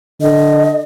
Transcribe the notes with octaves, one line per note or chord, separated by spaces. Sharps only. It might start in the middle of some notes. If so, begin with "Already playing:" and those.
D3 D#5